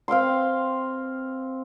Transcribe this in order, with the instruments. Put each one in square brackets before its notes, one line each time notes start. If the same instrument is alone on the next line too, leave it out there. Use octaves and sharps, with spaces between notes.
[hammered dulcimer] C4 F5 G5 C6